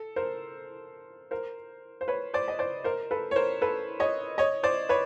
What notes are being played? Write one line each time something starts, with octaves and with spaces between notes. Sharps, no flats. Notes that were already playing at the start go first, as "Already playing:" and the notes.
Already playing: A4
A#4 C5
A#4 C5
C5
B4 C#5
C5 D5
D#5
C5 D5
A#4 C5
A4 B4
C#5
A#4 C5
A4 B4
C#5 D#5
C#5 D#5
C5 D5
B4 C#5